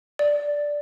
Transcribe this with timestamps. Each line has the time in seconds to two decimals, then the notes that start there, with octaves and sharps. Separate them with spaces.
0.19 D5